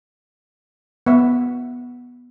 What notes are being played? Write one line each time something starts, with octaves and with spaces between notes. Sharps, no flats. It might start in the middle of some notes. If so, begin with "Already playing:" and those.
B3 E5